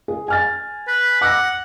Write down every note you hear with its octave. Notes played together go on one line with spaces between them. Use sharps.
G#4
G#5 F6 A6
B4
F#5 D6 E6 A#6